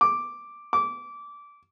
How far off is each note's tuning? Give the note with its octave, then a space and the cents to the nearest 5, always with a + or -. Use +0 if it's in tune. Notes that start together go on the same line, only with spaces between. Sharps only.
D6 +0
D6 -20